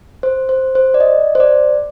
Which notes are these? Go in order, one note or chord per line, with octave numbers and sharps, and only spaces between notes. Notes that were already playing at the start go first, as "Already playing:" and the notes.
C5
C5
C5
D5
D#5
C5
D5